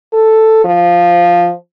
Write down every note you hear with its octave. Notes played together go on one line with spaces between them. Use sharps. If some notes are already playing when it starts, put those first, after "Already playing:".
A4
F3